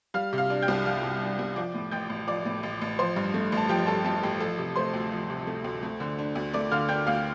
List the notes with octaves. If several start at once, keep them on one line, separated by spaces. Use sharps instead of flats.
G3 F5 F6
C3
F5 F6
D4
G5 G6
C2
G3 F5 F6
C3
D4
C2
F3 D5 D6
A2
A1 G5 G6
A1
F3 D5 D6
A2
A1
A1
F3 C5 C6
G2
A3
A1 A5
F3 G4 G5
G2 A4 A5
A3 A4 A5
A1 G4 G5
F3 A4 A5
C3
A3 C5 C6
D2
F3
C3
A3
D2
A3
D3
D4
D2
A3 D5 D6
D3 F5 F6
D4 G5 G6
D2 F5 F6